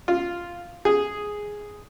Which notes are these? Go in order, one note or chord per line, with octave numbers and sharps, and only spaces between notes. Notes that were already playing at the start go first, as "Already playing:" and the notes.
F4
G#4